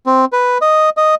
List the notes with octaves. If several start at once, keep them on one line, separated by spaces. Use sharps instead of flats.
C4
B4
D#5
D#5